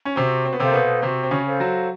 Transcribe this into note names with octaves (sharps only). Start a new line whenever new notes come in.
C#4
C3 C4 F#4
C4
B3
C3 C4 A4 C5 F5
A#3
B2 B3
C3 C4 F#4
C4
C#3 C#4
A4 C5 F5
F#3 F#4